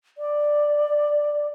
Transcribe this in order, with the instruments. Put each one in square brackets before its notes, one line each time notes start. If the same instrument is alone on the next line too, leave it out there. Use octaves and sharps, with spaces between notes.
[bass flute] D5